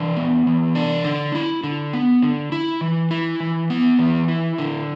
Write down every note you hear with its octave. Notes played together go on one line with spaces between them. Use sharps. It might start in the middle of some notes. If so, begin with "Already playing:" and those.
Already playing: E3 D4
B3
E3
D4
D3
E4
D3
B3
D3
E4
E3
E4
E3
B3
E3
E4
D3